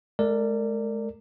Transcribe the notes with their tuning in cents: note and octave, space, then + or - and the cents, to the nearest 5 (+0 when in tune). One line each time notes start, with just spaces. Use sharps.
G#3 +40 A#4 -30 D5 +0